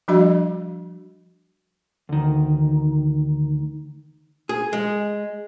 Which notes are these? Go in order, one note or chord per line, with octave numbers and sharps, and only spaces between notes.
F3 G3 D4 F#4 D#5 B5
D2 D#3
G#4
G#3